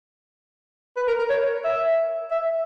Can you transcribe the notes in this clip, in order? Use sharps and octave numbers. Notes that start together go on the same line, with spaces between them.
B4
A#4
A#4
C#5
E5
E5